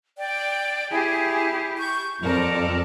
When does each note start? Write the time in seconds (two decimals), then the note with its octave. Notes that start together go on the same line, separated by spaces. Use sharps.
0.17 D5 G5
0.90 E4 G4 G#4
1.79 C#6 G6
2.23 F2 A4 A#4 D5